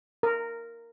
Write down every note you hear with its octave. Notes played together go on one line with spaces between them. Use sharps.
A#4